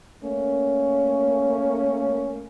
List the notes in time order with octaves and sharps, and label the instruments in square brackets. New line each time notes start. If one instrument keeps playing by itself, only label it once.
[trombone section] A3 A#3 C#4